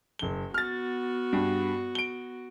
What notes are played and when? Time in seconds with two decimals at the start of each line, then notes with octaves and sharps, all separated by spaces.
0.19 F#1 G7
0.54 B3 F#4 F6 A6
1.33 G2
1.95 D7 G7